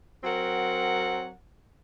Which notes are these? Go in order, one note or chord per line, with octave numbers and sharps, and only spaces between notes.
F#3 C4 A#4 F#5